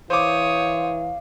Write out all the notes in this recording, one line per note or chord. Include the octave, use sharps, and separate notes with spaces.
E3 C5 C#5 F5 D6 D#6